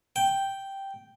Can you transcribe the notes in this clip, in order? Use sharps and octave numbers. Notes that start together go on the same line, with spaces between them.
G5